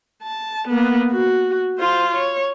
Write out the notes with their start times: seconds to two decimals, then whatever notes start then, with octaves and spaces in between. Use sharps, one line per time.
0.23 A5
0.68 A#3 B3
1.12 F#4
1.78 F4 C5
2.14 C#5